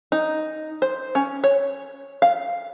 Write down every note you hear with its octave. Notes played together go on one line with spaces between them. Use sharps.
D#4
C5
C#4
C#5
F5